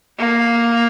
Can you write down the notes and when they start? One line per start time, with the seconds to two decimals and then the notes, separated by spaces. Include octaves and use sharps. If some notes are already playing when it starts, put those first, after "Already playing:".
0.18 A#3